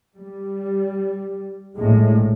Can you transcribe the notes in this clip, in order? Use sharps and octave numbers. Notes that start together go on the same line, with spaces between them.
G3
A#1 A2 G#3